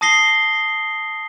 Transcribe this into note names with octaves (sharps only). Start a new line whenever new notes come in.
A5 D#6 A#6 C7 G7